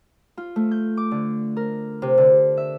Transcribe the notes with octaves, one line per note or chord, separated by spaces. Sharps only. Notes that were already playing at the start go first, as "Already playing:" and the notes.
F4
A3
G6
D6
D3
A#4
C3
D3
E5